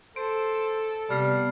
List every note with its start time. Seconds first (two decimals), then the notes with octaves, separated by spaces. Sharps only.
0.16 A4 C5 D7
1.09 C3 G3 B3 A5 F6 C7